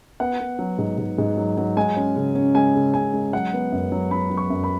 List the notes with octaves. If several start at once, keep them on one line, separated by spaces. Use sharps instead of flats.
B3 F#5
B3
F#3
G#2
G#2
G#2
F#3
F#3
G#3 G#5
C#4
C#3
C#4
G#3 G#5
C#3
C#3 G#5
G#3
F#3 F#5
B3
F#2
F#3
F#3 B5
F#3
C#6
F#2
B5